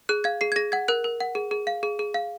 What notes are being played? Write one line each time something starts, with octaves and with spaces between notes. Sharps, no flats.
G#4 F#6
F5 G#6
G#4 C7
G#6
G#4 A#6
F#5 G#6
A#4 F#6
A#4
F#5
G#4
G#4
F5
G#4
G#4
F5